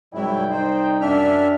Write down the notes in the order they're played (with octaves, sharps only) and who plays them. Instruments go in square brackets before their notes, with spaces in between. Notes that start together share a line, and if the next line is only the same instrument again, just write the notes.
[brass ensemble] C2 D5 G5 [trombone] G#2 [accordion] F#3 E4
[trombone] D#4 [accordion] C5
[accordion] F#2 E5 F6 [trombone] D4